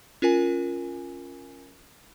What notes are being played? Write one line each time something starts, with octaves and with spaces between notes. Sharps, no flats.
C#4 F4 A#4 G#5